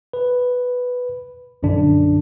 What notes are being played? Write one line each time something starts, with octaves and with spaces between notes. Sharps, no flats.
B4
A#1 F#2 D3 D4